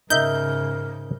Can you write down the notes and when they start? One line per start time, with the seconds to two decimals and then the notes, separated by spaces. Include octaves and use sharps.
0.10 G#2 C#3 D#4 A#4 D#5 E5 G6